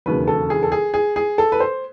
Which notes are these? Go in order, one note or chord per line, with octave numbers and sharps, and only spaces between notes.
E1 D#2 C#3 F#3 B4
A4
G#4
A4
G#4
G#4
G#4
A4
B4
C5